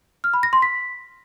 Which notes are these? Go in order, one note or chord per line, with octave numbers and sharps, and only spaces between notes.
F6
B5
A#6
C6
B6